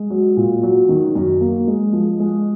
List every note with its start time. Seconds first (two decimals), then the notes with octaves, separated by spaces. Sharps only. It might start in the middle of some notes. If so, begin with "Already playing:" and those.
Already playing: G#3
0.10 F#3
0.37 A#2
0.63 F#3
0.89 D#3
1.15 F#2
1.41 A#3
1.67 G#3
1.93 F3
2.20 G#3